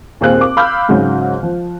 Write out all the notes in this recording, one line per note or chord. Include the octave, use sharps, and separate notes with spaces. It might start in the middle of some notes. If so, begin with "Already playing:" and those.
D#2 A#2 C4 G#4 F5 F#6
D6
F5 B5 D6 E6 F6 G6
G#2 C#3 F#3
F3